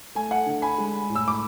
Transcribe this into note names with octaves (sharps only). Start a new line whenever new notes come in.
A3 G#5
F#5
D3
G#5 B5
G#3
A2
E6
D6